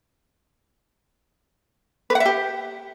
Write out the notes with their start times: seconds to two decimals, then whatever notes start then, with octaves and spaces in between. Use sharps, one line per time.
2.10 B4
2.15 F#5
2.20 E5
2.25 G4